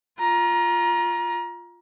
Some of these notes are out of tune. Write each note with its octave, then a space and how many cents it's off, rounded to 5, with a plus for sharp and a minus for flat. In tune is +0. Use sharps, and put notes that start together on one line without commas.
F4 +0 A#5 +25